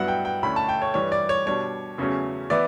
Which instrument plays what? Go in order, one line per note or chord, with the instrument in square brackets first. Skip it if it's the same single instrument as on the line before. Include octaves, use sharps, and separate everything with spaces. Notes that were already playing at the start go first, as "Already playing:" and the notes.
Already playing: [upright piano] G2 F#3 B3 E4 F#5
G5
G5
D2 D3 A3 C#4 E4 B5
A5
G5
C#5
G2 E3 G3 C#5
D5
C#5
B2 G3 D4 C#5
E2 C#3 F#3 A3 C#4
E3 B3 E4 D5